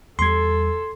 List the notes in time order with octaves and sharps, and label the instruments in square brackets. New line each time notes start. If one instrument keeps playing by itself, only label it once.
[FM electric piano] E2 G3 [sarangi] A4 [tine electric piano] C6 G#6